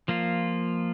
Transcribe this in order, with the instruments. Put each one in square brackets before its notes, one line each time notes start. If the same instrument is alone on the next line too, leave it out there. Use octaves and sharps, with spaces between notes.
[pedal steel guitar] F3 A#3 F4